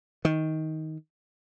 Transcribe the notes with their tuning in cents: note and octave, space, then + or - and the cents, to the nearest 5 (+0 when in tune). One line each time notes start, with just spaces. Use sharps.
D#3 +15